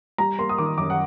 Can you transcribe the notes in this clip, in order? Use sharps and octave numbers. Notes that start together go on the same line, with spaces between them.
G3 A#5
A#3 C6
D#6
D#3 D6
F#2 D6
F#5